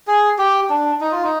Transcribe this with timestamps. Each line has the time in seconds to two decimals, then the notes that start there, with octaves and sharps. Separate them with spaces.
0.07 G#4
0.39 G4
0.70 D4
1.01 D#4
1.12 F4
1.24 D#4